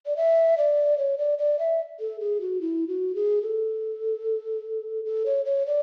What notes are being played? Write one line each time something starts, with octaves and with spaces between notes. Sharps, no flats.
D5
E5
D5
C#5
D5
D5
E5
A4
G#4
F#4
E4
F#4
G#4
A4
A4
C#5
C#5
D5